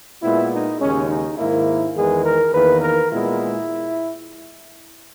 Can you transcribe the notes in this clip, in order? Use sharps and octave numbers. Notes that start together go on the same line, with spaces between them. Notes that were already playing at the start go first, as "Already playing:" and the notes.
A#2 G#3 B3 E4
D#4
D#2 C#3 G#3 C#4
D#4
G#2 D#3 A#3 E4
E2 D#3 G#3 B3 G#4
A#4
E2 D#3 A#3 B4
A#4
A#2 G#3 B3 E4